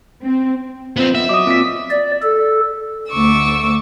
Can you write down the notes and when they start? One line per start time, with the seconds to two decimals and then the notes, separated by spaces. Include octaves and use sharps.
0.25 C4
0.97 F2 B3 C4 C5
1.15 B3 E5
1.29 F#3 D#5 D6 D#6
1.47 A#2 C4 B6
1.91 D5
2.22 A4
3.10 D2 A3 C#6 D6 E6